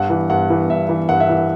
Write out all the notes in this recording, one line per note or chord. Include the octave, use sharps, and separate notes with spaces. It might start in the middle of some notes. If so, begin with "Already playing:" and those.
Already playing: G2 F#5
E3
G2 F#5
E3
G2 E5
E3
G2 F#5
E5
E3 F#5